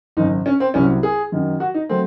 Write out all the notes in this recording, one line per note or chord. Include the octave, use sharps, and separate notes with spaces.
G#1 F#2 C#3 D#4
C#4
C4
C2 C3 F#3 C#4
G#4
F#2 D#3 F#3
F#4
D#4
F#3 A3 C4